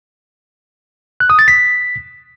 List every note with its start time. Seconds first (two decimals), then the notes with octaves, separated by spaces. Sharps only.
1.20 F#6
1.30 D#6
1.39 A6
1.48 B6